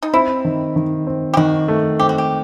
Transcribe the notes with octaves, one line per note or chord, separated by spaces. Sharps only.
D#4
C4 E4
D#3
D#3
C4
G4
D#3 F#4
A3
C4 G4
F#4
G4